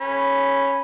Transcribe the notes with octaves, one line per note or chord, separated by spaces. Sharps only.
C#4 B5